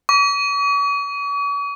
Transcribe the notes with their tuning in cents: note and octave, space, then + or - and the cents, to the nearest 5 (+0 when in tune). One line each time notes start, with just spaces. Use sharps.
C#6 +45